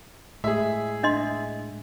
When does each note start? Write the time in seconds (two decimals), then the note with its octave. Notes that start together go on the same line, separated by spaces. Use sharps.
0.44 A2 G#3 G#4 E5
1.03 D4 D#5 C6